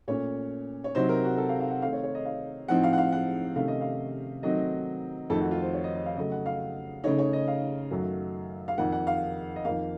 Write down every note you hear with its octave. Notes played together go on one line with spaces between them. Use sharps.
A#2 A3 C#4 C#5
C#5
C3 F#3 C4 D#4 C5
A#4
F#4
A4
F5
F5
F#5
D#3 A3 C4 D#4 F5
C#5
C#5
D#5
F5
A2 F3 C4 D#4 F#5
F5
F#5
F5
F#5
C3 D#3 A3 C#4 F5
D#5
F5
D#3 F#3 A3 C4 D#4 D#5
F2 D#3 A3 C4 A4
F#4
F4
C5
C#5
D#5
D#5
F5
C#3 F#3 A3 D#5
F#5
F5
C#3 A3 D#4 C#5
C#5
D#5
F5
F#2 D#3 F#3 A3
F5
F2 D#3 A#3 F#5
F#5
F5
D#5
F2 D#3 A#3 F5